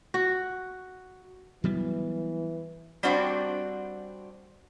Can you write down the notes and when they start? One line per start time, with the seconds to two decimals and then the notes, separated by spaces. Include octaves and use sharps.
0.14 F#4
1.64 E3 F#3 G3 B3
3.03 G3 C4 D4 F#4 C5 F#5